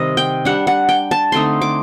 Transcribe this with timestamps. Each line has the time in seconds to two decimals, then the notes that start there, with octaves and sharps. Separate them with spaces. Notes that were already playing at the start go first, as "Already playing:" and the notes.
Already playing: C3 D#3 G3 D#5
0.17 G5
0.45 G3 D4 F#5
0.67 F#5
0.89 G5
1.11 A5
1.32 D3 A3 C4 D#4 C6
1.62 D6